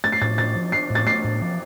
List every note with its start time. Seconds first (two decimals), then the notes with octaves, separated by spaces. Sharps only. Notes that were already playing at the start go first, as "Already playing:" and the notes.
0.04 A3 A6
0.12 C7
0.22 A2 A6
0.38 A2 A6
0.56 F3
0.72 D4 C7
0.90 A2
0.95 A6
1.07 A3 C7
1.24 A2
1.41 F3